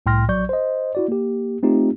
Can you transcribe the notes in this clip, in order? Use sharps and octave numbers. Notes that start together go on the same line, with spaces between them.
C2 A2 G5 C6 F6 A#6
A#1 F#3 D5 C#6 G6
C5 D#5
E4 F#4 D5
A#3 G4
A3 C4 D#4 F4 G4